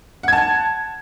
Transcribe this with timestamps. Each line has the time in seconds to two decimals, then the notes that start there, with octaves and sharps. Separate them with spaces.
0.23 F#5
0.28 G#6
0.33 A5